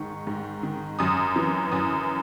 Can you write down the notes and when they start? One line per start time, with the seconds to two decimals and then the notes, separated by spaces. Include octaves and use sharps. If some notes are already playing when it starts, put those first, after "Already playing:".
Already playing: G#2 D#3 C#6
0.27 G#2
0.63 D#3
0.99 F#2 D#6
1.36 E3
1.72 F#2 D#6